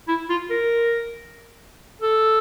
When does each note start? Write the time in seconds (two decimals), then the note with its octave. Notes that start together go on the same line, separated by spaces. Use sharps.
0.08 E4
0.29 F4
0.50 A#4
2.02 A4